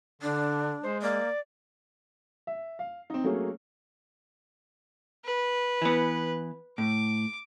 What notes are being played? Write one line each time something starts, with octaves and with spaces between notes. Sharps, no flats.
D3 D4
G#3 C5
A#3 D5
E5
F5
C4 D#4
F#3 A3 A#3 C#4 G#4
B4
E3 B3
A2 D6